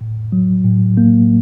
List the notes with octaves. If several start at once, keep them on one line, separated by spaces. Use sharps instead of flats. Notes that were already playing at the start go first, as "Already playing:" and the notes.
A2
F#3
A2
A#3